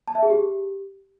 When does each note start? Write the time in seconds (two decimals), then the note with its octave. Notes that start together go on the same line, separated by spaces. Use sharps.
0.08 A5
0.15 E5
0.23 G#4
0.30 G4